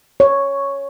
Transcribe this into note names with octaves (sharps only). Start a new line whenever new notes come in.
C#5